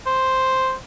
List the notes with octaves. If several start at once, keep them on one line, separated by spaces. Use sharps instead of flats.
C5